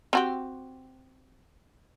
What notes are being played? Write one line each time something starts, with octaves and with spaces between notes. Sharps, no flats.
C4 F#4 G4